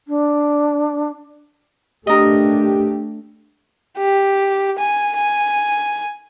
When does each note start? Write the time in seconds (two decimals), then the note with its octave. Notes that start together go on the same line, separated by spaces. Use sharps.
0.07 D4
2.07 A3 D4 G4 A#4 D#5
3.98 G4
4.78 G#5
5.16 G#5